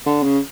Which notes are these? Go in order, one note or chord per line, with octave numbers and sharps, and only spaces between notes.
D3
C#3